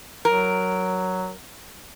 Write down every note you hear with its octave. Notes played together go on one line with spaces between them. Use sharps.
F#3 A#4